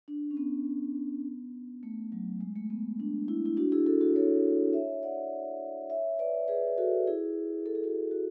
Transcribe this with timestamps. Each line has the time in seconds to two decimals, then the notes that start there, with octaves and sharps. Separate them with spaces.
0.08 D4
0.31 C#4
0.37 B3
1.83 A3
2.12 F#3
2.41 G#3
2.56 A3
2.70 B3
3.00 D4
3.28 E4
3.46 E4
3.57 D4 F#4
3.72 E4 G#4
3.86 F#4 A4
4.01 F#4 A4
4.15 A4 C#5
4.73 C#5 E5
5.03 D5 F#5
5.90 C#5 E5
6.19 B4 D5
6.48 G#4 B4
6.78 F#4 A4
7.07 E4 G#4
7.66 A4
7.75 G#4
7.83 F#4 A4
8.11 F#4